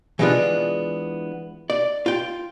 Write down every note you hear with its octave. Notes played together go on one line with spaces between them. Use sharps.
E3 G#3 A#3 B3 D4 F4
D5
F4 G5